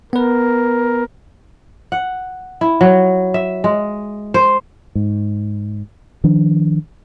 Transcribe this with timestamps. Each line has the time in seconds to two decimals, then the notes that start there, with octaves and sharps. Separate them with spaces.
0.13 B3 A#4 B4
1.92 F#5
2.61 E4
2.81 F#3
3.34 E5
3.64 G#3
4.34 C5
4.95 G#2
6.24 D#3 F3 D4